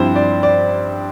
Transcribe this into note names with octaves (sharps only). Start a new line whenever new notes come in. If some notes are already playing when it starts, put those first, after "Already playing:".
Already playing: G2 F3 C4 E4 C5
D5
D5